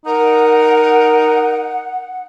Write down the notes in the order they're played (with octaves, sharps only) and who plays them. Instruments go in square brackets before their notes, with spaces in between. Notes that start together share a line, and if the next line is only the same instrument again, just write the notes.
[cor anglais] D#4 [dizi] A#4 [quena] F#5